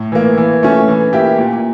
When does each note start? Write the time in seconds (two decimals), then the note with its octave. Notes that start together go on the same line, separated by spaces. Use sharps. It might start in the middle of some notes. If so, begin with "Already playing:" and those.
Already playing: A2
0.12 E3 A#3
0.37 E3
0.63 A3 C#4
0.88 E3
1.13 A#3 E4 G4
1.38 A#2